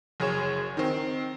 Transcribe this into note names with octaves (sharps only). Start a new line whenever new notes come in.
F#1 G#4 C#5 E7
D#3 C4